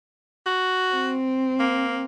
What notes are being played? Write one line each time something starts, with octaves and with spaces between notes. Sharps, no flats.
F#4
C4
A#3